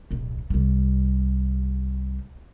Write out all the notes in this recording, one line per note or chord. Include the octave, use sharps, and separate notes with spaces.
D1 B1
C2 G3